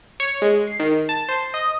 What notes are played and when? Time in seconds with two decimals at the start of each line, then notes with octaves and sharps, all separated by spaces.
0.20 C#5
0.42 G#3
0.67 C7
0.79 D#3
1.09 A5
1.29 C5
1.54 D#5